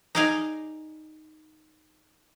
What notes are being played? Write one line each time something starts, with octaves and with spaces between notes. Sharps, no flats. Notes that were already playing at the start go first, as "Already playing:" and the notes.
D#4 G#4 D5 D#5 F5 G#5